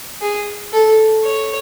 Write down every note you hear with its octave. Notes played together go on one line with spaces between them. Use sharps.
G#4
A4
C#5